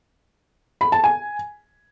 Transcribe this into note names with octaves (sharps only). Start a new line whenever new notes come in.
B5
A5
G#5